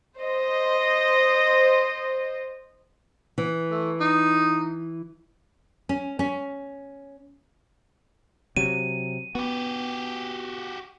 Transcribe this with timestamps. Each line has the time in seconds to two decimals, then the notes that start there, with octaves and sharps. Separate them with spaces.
0.18 C5 D#5
3.38 E3
3.71 A3
4.00 D#4
5.89 C#4
6.19 C#4
8.57 C3 F#3 D#7
9.35 B3 F#4 G4